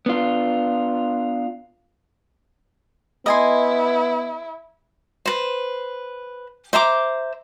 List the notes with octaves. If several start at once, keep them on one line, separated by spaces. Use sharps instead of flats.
B3 D4 F4
B3 E4 D#5 G#5 C6
B4 C5
C5 E5 A#5 D6